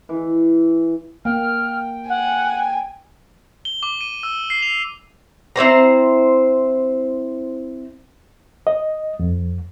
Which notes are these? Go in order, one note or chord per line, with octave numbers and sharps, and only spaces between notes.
E3
A#3 G5 F6
F#5 G#5
G7
D6
D#7
E6
C7
F7
C4 E4 C5 A#5
D#5
F2